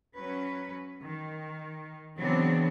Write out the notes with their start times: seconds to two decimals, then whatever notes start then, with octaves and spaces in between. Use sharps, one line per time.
0.16 F#3 C#4 B4
1.02 D#3
2.18 C#3 E3 F#3 B3 C4 D4